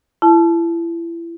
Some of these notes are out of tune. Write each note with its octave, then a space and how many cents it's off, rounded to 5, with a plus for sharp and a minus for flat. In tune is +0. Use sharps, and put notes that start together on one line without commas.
E4 +30 A5 -20